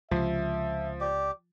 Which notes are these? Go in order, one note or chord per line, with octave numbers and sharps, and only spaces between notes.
C#2 C3 F3 E5
G4 D5